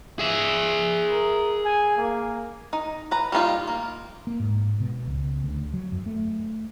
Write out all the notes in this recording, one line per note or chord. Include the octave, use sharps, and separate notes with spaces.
G#4 E5
A#4
G#5
A#3
D#4
B4 A#5
G3 A#3 D#4 F4
A#3
A#3
G#2
B2
C#2
D2
F#3
F#2
A3